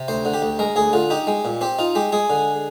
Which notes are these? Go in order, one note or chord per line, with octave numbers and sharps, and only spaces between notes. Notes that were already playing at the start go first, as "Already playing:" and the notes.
Already playing: C3
D2 C5
D3
G4
D2
G#3 A#4
D2 G#4
D3 F4
D#4 G4
G#3
A#2
C4 G4
D#4 F4
G#3 G4
G#3 G#4
D3